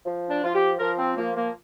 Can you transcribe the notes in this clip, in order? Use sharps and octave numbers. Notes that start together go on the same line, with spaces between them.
F3
D4
F3 F4
G4
F3 A#4
C4
F3 A#3
A#3